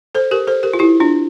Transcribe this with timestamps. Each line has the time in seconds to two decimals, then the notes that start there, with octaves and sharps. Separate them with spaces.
0.15 A4 C5
0.31 G4 A#4
0.47 A4 C5
0.63 G4 A#4
0.74 F4
0.79 E4 G4
1.00 D4 F4